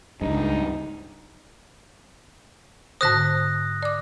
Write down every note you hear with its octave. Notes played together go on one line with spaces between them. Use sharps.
C#2 G2 D#4
G#2 D3 C5 D#6 F#6 A#6
D5 D6